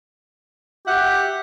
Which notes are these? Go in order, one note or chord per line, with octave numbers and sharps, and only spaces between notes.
G4 E5 F#5